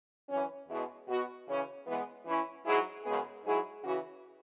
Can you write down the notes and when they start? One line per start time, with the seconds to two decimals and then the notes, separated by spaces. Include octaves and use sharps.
0.29 F#2 E3 C#4
0.68 E2 B2 G#3 E4 G#4
1.08 B2 B3 F#4
1.47 C#3 E3 C#4
1.87 E3 G#3 B3
2.26 E3 C#4 E4
2.65 G#2 F#3 E4 G#4
3.04 F#2 C#3 G#3 B3 G#4
3.43 G#2 F#3 E4 G#4
3.83 C#3 E3 C#4 F#4